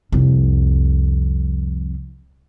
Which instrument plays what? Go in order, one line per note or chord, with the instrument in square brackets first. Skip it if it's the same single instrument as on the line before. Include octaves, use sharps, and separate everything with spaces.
[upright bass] C2 F2